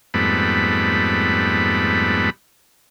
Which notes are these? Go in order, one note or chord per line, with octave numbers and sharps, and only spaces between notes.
F2 G#2 G3 A3 B3 B5